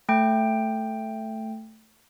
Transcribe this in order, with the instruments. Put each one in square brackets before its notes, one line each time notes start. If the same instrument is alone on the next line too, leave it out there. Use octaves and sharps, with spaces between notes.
[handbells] A3 G5